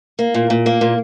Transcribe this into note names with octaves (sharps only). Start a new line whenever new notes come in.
A#3
A#2
A#2
A#3
A#2